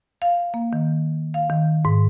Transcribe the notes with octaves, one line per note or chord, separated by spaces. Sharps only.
F5
A#3
D#3
F5
D#3
G#2